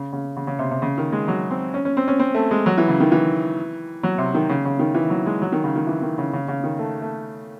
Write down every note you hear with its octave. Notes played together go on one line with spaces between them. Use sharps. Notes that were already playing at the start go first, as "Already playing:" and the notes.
Already playing: C#3
C#3
C#3
C#3
C3
C3
C#3
D#3
G#3
F#3
C4
C#4
C#4
C4
C#4
C4
A3
G#3
F#3
E3
C#3
D#3
E3
F#3
C3
D#3
C#3
C#3
D#3
E3
F#3
G#3
F#3
D#3
C#3
D#3
E3
D#3
C#3
C#3
C#3
D#3
A3
A3